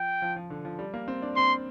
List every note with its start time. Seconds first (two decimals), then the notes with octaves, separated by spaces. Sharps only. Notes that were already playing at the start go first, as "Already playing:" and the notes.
Already playing: F3 G5
0.22 F3
0.36 F3
0.50 D3
0.65 F3
0.79 G3
0.94 A#3
1.08 C4
1.22 D4
1.37 C4 C6